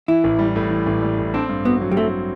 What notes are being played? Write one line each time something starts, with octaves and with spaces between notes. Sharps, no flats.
E3 E4
A1
G3
A2
E3
A1
G3
A2
C4 D4
G2
B3 F#4
F#3
G3
A3 C4